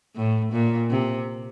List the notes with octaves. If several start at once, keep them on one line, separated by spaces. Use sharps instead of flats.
A2
A#2
C3